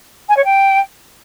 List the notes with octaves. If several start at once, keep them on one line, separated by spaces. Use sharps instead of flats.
G#5
C#5
G5